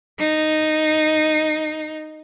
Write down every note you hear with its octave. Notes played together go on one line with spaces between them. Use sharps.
D#4